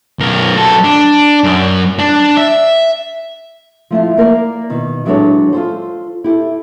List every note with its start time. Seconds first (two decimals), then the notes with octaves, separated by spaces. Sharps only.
0.20 B1 A#4
0.57 F#3 A4
0.84 D4
1.44 F#2
1.99 D4
2.37 E5
3.91 F3 A3 E4 F4
4.17 A#3 A#4 B4 D5
4.70 B2 D#3
5.05 E3 F#3 G#3 D4 A4 C#5
5.52 F4 A4 C5
6.24 E4 G4 A4